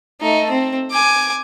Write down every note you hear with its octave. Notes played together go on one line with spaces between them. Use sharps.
A3 D#4
C4
G#5 D6